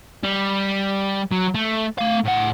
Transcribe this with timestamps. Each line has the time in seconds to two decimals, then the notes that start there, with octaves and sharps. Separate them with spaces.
0.23 G3
1.32 F#3
1.55 A3
1.99 A3 F5
2.25 A2 F#5